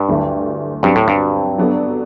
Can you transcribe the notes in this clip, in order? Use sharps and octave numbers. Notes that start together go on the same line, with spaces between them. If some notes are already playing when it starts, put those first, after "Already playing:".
Already playing: G2
D2 D3 F#3 A3 E4
G2 F#3 C4 G4
A2
G2
F#3 B3 D4 A4 D5